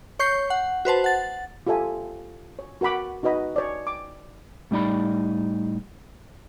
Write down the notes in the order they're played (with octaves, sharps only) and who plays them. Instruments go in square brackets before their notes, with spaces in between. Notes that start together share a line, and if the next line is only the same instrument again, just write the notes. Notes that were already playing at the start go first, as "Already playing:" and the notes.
[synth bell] C#5 C#6 G6 C7
F#5
F#4 B4 C5 A5
F#5 A6
[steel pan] F4 G4 A4 E5 G#5
C#5
F#4 A#4 F#5 B5 D6
D#4 F#4 B4 D#5 B5
C#5 D5
D6
[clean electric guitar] A2 G3 D4 D#4 D5 B5